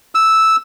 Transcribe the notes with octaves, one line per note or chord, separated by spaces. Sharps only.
E6